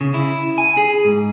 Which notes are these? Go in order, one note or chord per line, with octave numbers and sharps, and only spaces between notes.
C#3
E4
G#5
G#4
G#2